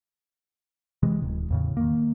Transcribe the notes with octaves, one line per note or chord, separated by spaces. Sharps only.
C3 E3 G#3
D1
E2 A2 C#3
D#3 A#3